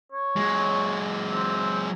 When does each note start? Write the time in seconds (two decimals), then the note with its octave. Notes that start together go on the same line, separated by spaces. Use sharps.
0.12 C#5
0.36 F#3 G#3
1.31 C4